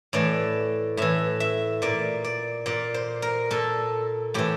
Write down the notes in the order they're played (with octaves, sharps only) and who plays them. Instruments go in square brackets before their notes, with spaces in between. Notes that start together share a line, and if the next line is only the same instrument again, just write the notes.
[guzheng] A2 E3 D5
A2 E3 E5
E5
A#2 D5
D5
A#2 D5
C5
A#4
A#2 A4
A2 E3 G4